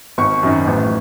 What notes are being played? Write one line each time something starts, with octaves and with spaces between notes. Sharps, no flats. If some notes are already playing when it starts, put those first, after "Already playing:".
G#1 C#6
F#2 D#3
A1